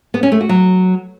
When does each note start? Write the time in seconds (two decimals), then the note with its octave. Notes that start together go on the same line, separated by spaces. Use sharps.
0.14 B3
0.23 C#4
0.32 A3
0.41 F#4
0.49 F#3